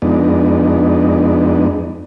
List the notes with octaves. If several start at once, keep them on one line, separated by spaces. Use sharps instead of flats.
F2 G#3 B3 D4 D#4